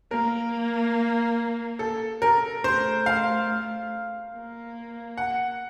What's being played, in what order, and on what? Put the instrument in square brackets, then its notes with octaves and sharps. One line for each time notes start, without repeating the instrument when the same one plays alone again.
[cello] A#3 [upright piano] A#4
[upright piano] A4
A#4
[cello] A3 [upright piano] C5
[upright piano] F5
[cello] A#3
[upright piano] F#5